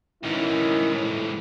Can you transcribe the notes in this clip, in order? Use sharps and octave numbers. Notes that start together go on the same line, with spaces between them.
G#2 D#3 E3 C#4 E4
A2